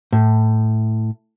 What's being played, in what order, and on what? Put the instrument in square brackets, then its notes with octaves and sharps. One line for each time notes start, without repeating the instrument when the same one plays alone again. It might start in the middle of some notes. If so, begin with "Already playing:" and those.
[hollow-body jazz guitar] A2